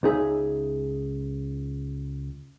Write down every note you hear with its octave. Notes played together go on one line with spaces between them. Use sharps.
C#2 D#4 G#4 E5